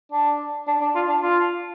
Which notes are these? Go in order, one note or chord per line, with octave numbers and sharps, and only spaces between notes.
D4
D4
D4
F4
D4
F4